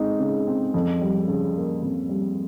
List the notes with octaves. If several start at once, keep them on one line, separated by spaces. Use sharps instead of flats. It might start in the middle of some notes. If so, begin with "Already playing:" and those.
Already playing: G#3 C4 D#4
C#3
C4
F2
G3
C#3
A#3
F2
G3